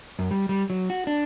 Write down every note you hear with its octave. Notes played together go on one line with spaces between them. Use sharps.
F#2
G3
G3
F#3
F#4
D4